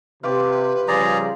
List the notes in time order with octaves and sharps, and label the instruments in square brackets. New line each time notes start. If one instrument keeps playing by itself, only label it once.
[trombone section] C3 [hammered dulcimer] F4 G4 D6 [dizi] B4
[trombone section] C#3 F3 G3 [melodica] G#4 D5 A#5